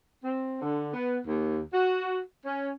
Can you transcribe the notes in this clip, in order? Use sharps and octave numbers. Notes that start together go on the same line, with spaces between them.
C4
D3
B3
D#2
F#4
C#4